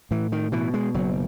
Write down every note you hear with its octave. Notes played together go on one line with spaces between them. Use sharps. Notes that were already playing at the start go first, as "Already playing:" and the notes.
A2 E3
D#3
B2 E3
G#3
F#1 F#3